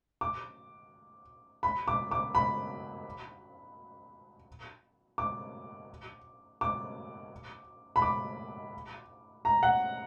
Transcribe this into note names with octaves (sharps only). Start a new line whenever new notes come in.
D6
B5
D6
D6
B5
D6
D6
B5
D6
A#5
F#5